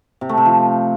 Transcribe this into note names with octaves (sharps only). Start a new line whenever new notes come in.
C3
A3
C3
F3